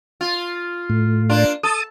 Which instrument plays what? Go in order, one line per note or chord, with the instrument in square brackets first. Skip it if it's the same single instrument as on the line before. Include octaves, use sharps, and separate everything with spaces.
[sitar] F4
[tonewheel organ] A2
[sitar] A#3 D4 F4
[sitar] A4 [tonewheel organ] A5 D#6